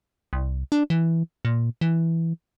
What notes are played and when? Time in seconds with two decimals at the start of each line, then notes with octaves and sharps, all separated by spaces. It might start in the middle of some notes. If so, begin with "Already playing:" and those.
0.33 C2
0.72 D4
0.90 E3
1.45 A#2
1.81 E3